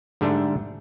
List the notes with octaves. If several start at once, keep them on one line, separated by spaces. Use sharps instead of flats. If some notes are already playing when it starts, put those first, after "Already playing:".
G#2 D3 G3 A3 D4